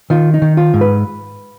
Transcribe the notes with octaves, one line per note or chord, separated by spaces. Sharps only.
D#3 F4
D#4
D#3
F4
G#2
B4